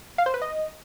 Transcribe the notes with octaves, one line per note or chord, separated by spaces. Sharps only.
F5
C5
B4
D#5